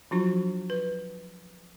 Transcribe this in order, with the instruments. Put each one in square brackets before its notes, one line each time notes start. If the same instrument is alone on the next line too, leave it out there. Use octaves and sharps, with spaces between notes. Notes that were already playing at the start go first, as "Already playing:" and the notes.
[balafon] F3 F#3 D4 F4 F#4
B4